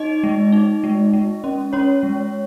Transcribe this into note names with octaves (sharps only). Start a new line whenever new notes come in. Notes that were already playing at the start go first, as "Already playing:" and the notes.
Already playing: D#4 D#5
G#3
D#4
G#3
G#3
C#4
C#4 C#5
G#3